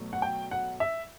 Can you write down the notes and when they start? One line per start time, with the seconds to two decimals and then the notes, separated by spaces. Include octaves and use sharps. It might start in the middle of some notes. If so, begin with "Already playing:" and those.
Already playing: B2 F#3 A3
0.13 F#5
0.22 G5
0.51 F#5
0.80 E5